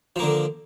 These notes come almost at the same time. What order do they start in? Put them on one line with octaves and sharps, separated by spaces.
F3 A#3 D3